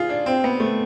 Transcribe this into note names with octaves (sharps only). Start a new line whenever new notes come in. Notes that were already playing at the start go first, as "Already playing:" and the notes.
Already playing: F4 G#4
D4
C4
B3
A3